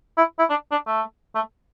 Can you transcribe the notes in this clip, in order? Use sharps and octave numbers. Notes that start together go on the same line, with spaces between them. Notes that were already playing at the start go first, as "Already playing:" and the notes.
E4
E4
D4
D4
A3
A3